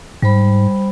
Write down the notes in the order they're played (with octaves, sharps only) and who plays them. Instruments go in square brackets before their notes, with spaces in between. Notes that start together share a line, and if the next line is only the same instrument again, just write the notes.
[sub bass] G#2 [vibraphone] G3 C5 B5